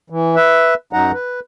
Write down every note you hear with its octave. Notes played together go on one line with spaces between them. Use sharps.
E3
B4 E5
F#2 F#3 D#4 F#5 A#5
B4